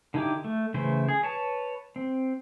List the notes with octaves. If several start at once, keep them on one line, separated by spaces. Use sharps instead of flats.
D3 D#4 E4 G4 D6
A3
C#3 E3 A3 E4 C5
G#4
B4 C#5 A5
C4